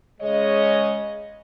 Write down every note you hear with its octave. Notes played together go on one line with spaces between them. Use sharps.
C#3 G#3 C#5 D#5